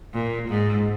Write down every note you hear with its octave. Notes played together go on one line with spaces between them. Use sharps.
A#2
G#2